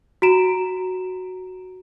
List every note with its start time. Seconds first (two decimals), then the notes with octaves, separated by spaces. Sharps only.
0.22 F#4 A#5 D7 E7